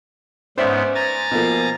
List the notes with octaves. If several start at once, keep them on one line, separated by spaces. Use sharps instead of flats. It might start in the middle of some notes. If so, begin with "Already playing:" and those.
G#2 B3 C#4 C5 D5 E5
G#5 A#5 A6
B2 F3 A#3